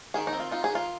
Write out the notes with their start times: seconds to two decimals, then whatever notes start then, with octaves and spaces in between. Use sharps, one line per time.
0.14 D#3 G#4
0.27 D#4
0.33 C4
0.40 F4
0.51 D#4 F4
0.64 G#4
0.70 D#3
0.75 F4